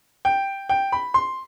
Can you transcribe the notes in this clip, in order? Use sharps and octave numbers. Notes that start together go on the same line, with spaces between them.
G5
G5
B5
C6